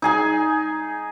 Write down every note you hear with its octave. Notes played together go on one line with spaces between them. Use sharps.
D#4 G#4 G#5